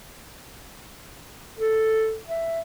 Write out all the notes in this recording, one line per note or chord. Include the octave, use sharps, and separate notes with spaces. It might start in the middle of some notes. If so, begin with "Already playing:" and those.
A4
E5